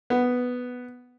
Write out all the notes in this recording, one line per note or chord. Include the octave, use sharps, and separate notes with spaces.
B3